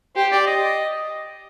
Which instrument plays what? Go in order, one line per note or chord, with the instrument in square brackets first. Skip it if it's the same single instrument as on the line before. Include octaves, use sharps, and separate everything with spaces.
[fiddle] G4 [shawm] C5
[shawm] D5
D#5